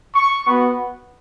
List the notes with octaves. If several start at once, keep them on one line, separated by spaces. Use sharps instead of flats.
C#6
B3 F#4